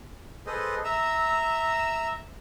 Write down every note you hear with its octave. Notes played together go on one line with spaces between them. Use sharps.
G#4 A4 B4 C5 D#5
E5 A#5 E6